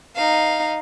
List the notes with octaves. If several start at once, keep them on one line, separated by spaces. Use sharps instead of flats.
D#4 F5